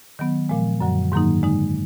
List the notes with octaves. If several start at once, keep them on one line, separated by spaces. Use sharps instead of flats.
D#3 F#3 B3
A#2 F3 G#3
F#2 D3 F#3
G#2 D#3 F#3 A#3 D#4
D3 G#3 D#4